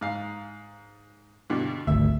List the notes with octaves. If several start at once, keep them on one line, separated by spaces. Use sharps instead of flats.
G#2 F5
G2 B2 D3
G#1 D2 E5